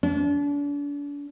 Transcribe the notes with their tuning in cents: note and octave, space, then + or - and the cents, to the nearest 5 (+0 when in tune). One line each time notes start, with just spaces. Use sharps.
D4 -40